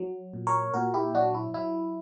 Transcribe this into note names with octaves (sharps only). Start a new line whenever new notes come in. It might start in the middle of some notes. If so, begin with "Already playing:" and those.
Already playing: F#3
A#2
A#4 C#5
A#2 F#4 A#4
E4 G4
F#3 D4 F#4
E4
F#3 E4